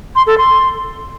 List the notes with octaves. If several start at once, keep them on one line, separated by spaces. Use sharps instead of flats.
C6
A4
C6